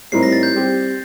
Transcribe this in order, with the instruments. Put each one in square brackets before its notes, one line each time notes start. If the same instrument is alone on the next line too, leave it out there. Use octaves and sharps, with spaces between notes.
[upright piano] A2 G3 C4 D#4 A#4 [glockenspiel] C7
[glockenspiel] A#6
A6
G6
[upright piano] G3 C4 G4